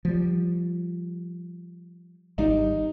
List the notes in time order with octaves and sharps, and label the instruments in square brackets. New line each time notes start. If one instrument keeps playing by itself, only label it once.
[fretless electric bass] F3 G3
[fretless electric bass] G#1 G3 [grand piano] D#4